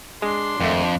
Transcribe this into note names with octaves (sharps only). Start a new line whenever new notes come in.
G#3 D4 C6
G#1 F2 A3